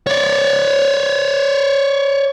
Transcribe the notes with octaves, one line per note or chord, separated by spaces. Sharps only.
C#5 D5